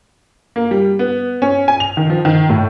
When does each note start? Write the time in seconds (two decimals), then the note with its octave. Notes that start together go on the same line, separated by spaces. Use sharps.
0.56 A#3
0.71 G3
0.99 B3
1.42 C#4
1.68 G#5
1.80 F7
1.97 D#3
2.10 F3
2.25 D#3
2.49 A2